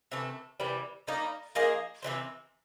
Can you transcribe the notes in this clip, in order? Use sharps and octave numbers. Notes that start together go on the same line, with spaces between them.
C3 E3 A3
C3 E3 G3
G3 A#3 D#4
F3 A#3 D#4 G#4
C3 E3 G3 C4